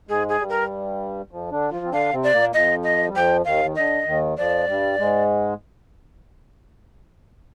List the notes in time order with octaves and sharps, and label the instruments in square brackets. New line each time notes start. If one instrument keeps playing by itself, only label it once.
[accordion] G#2 G#3 [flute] G#4
[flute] G#4
[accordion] G2 G3
[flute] A#4
[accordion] F2 F3
D3 D4
F3 F4
C4
[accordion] D3 D4 [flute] F5
[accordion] C3 C4
[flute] D5
[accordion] A#2 A#3
[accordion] F2 F3 [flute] D#5
[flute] D#5
[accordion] G3
[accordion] F2 F3 [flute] G5
[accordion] D#2 D#3 [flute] F5
[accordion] D#3
[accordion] D3 [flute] D#5
[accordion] D#2 D#3
[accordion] F2 F3 [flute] D5
[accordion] G2 G3
G#2 G#3